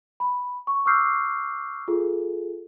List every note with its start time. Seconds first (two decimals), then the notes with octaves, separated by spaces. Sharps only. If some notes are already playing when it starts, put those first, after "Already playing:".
0.20 B5
0.67 C#6
0.86 C#6 D6 E6 F6 G6 C7
1.88 F4 G#4 A4